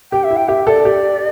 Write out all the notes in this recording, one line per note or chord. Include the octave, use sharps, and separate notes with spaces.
G4 G5
E5
E4
G5
G4 E5
A4 D5
G4